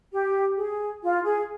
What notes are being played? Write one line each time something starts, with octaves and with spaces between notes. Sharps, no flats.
G4
G#4
F4
G#4